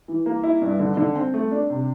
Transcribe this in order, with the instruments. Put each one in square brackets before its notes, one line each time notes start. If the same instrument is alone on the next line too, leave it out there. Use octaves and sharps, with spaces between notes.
[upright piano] E3
A#3
E4
G2
D3
D3
C4
A3
D4
C3